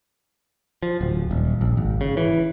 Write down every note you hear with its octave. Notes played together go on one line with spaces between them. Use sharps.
F3
D1
D#1
A#1
G#1
C#3
E3